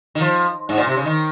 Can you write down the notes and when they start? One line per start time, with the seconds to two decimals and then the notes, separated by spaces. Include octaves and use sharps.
0.15 D#3
0.21 F3
0.69 G#2
0.77 A#2
0.87 C3
0.97 C#3
1.06 D#3